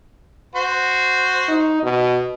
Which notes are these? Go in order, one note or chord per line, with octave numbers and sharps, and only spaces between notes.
F#4 C5
D#4
B2